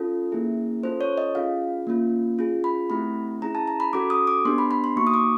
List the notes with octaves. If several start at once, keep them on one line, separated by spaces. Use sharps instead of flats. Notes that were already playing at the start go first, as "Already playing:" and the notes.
Already playing: C#4 F4 A4
A#3 C#4 E4 G#4
C#4 F4 A4 C5
C#5
D#5
C#4 F4 G#4 F5
A#3 C#4 F4
C#4 F4 G#4
B5
A3 C4 E4 G4 B5
C#4 E4 G#4 A#5
A5
A#5
B5
C#4 F#4 A4 D6
D#6
D6
B3 D4 G4 C6
B5
B5
C6
A#3 D#4 F#4 C#6
D#6
D6